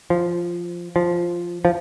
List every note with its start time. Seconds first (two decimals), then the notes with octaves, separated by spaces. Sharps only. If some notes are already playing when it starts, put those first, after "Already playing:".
0.10 F3
0.96 F3
1.65 F3